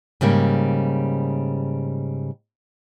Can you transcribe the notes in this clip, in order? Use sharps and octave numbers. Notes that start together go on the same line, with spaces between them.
G#2 C#3 G3 A#3